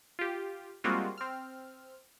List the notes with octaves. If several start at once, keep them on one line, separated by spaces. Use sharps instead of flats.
F4 G4
G3 G#3 A#3 C4 F4 F#4
C4 F6